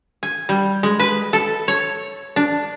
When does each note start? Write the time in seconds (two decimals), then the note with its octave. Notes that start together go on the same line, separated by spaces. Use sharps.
0.23 G#5
0.49 G3
0.83 G#3
1.00 B4
1.33 A4
1.68 C#5
2.36 D4